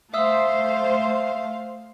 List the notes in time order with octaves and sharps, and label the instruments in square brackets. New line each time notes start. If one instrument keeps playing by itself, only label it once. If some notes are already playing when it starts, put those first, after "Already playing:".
[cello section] A3 C5 [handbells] E5 D#6 E6 [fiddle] F5